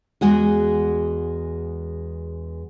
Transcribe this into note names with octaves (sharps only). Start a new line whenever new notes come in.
E2 G#3 F#4 G#4